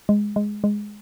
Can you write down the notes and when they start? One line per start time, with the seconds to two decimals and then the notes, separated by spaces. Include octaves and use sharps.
0.09 G#3
0.36 G#3
0.64 G#3